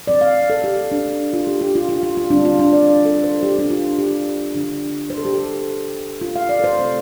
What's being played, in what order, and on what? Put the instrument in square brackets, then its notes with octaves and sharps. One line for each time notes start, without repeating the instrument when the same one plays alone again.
[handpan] D3 F3 C4 D5
F5
A4
G4
D4
F4
G4
G4
F4
F4
F4
F4
D3 G3 C4 D4
F4
D4
D5
D5
A4
C5
G4
D4
F4
G4
D3 F3 D4
C5
A4
G4
A4
F4
F5
D5
A4
C5
C3 A3 C4